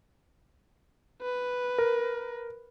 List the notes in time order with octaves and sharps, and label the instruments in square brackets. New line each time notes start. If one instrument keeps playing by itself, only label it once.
[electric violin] B4
[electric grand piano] A#4